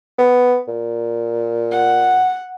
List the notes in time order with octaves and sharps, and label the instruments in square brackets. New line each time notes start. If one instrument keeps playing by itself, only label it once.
[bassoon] B3
A#2
[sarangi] F#5